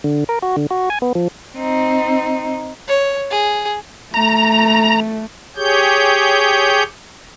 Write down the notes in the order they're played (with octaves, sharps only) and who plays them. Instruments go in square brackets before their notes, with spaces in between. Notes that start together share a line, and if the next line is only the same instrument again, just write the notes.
[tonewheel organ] D3
A#4
F#4
D3
F#4
G#5
B3
F3
[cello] C4 D#4
[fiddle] C#5
G#4
[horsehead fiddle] A3 [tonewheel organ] A#5
[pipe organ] G4 G#4 C#5 G6